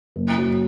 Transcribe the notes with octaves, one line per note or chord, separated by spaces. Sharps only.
F#1
F#3